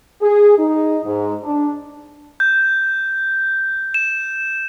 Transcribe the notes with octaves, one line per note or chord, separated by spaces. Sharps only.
G#4
D#4
G#2
D4
G6
E7